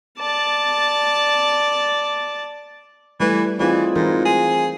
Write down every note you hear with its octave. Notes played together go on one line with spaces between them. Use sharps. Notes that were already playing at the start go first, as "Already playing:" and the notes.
D5 A5
E3 G3 A3 B4
E3 C4 D#4 F4 G#4 D5
G#2 E3 A#4
G#4